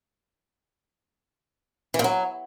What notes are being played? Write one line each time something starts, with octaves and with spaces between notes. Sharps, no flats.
E3
A#2
F#3